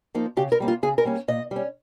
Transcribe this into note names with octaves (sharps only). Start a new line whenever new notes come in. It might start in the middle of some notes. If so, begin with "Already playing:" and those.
F3 A#3 D#4
C#3 G4
A#4
G3 A#3 C#4
F4
C#3 G#4
A#4
G3 A#3 C#4
A#2 D#5
G3 C#4